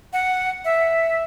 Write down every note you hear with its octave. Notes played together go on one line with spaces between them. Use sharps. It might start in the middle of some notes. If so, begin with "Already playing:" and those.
F#5
E5